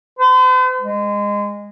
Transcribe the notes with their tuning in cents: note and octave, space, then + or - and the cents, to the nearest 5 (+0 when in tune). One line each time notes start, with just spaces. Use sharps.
C5 -45
G#3 -20